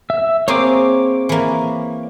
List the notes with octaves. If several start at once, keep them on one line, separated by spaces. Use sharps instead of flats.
E5
A#3 C4 G#4 C#5 D6
E3 A#3